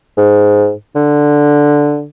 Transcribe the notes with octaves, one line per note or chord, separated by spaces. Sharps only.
G#2
D3